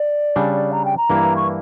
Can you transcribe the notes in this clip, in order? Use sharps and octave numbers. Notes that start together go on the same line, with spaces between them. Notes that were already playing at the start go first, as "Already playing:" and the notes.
Already playing: D5
C#3 G3 D4
A#5
G5
A#5
G2 E3 A#3 E4
C#6